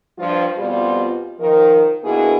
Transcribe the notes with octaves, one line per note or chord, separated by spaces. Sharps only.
G2 F3 F4
F2 B2 G3 F4
D#3 F3 A#4
B2 D3 A#3 E4 F#4 G#4